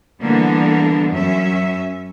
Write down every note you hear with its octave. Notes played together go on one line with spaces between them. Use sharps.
D3 E3 G3 A#3 B3 D4
F#2 C#4 E5